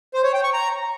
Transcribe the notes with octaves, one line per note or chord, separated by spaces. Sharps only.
C5
C#5
G5
C#6
A#5